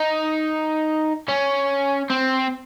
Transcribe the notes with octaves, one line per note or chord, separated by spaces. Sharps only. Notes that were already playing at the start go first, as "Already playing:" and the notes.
Already playing: D#4
C#4
C4